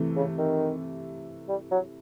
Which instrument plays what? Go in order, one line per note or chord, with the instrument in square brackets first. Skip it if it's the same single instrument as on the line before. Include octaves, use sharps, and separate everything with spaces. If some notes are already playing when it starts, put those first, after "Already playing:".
Already playing: [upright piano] C3 E3 A3
[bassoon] C#3
D#3
G3
F#3